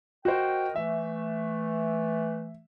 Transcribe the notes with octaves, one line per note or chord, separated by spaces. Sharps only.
F#4 A#4 C5 D#5 G5
E3 A3 E5